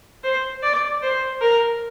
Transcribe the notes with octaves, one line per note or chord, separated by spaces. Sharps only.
C5
D5
C5
A#4